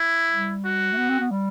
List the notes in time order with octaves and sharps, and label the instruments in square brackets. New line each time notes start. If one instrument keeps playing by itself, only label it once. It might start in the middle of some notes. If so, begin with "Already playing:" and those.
Already playing: [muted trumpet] E4
[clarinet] G3
[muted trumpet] F#4
[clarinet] A3
B3
C4
B3
G3